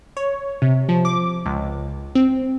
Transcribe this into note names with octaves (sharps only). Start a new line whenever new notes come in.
C#5
C3
F3
D6
C#2
C4